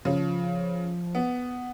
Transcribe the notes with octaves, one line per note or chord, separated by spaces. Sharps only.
C#3 F3
B3